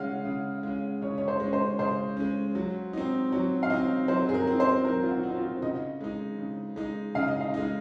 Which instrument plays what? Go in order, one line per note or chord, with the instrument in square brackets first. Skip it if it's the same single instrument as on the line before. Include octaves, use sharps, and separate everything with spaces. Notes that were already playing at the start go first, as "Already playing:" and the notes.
Already playing: [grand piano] C#3 G#3 C#4 [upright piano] F5 F#5
[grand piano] C#3
G#3 C#4
[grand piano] C#3 [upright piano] C#5
[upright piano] C#5
C5
[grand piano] G#3 C#4
[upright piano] C5
[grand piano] C#3 [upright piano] C5
[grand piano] G#3 C#4
F#3
C4 D#4
[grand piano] F#3 [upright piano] C#5
[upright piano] F5
[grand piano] C4 D#4 [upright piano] D#5
[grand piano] F#3 [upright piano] C5
[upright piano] G#4
A#4
[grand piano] C4 D#4
[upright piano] C5
[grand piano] F#3 [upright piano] A#4
[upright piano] F4
F#4
[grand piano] C4 D#4
[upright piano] F4
[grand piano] C#3 [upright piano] D#5
[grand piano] G#3 D#4
C#3
G#3 D#4
[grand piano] C#3 [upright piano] F5
[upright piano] D#5
F5
[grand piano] G#3 D#4